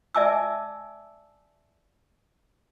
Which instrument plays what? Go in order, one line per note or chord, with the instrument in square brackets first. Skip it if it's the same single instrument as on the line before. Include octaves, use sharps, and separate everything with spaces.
[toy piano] D5 E5 G#5 A5 D6 E6